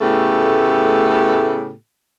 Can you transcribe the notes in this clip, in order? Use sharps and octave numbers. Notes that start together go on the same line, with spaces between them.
A2 C#3 A3 B3 G4 A4